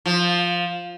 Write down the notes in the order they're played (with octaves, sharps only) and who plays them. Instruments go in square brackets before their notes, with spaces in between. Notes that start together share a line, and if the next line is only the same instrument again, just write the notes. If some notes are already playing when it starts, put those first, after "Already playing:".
[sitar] F3